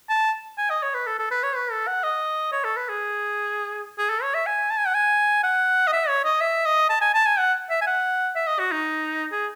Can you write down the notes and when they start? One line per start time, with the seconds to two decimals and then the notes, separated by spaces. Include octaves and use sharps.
0.09 A5
0.58 G#5
0.70 D#5
0.83 C#5
0.94 B4
1.07 A4
1.19 A4
1.31 B4
1.43 C#5
1.55 B4
1.71 A4
1.87 F#5
2.03 D#5
2.52 C#5
2.64 A4
2.76 B4
2.89 G#4
3.98 G#4
4.10 A4
4.22 C#5
4.34 E5
4.46 G#5
4.70 A5
4.78 G#5
4.87 F#5
4.94 G#5
5.43 F#5
5.87 D#5
5.93 E5
6.08 C#5
6.24 D#5
6.41 E5
6.65 D#5
6.89 A5
7.01 G#5
7.14 A5
7.26 G#5
7.38 F#5
7.70 E5
7.81 G#5
7.86 F#5
8.35 E5
8.47 D#5
8.59 F#4
8.71 D#4
9.32 G#4